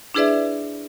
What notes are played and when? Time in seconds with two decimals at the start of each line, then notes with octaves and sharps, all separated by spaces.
0.14 D4 E4 G#4 B4 D5 E5